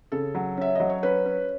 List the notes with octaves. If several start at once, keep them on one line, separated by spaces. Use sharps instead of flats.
C#3 A4
F#3
C#4 E5
F#3 D#5
C#5
C#4 B4
C#4